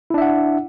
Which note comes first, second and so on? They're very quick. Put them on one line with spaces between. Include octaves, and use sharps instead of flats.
E4 D4 E5 F#5